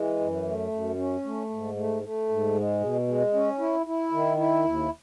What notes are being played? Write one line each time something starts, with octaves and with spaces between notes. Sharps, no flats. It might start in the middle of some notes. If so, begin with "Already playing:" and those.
Already playing: E3 G#3
F#2
A3
F#2
C#4
A3
G#2
A3
A3
G#2
G#3
B2
G#3
C#4
E4
E4
D#3
E4
D#2